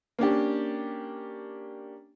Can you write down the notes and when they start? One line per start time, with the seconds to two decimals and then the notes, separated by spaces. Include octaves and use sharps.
0.19 A#3 C#4 D4 G4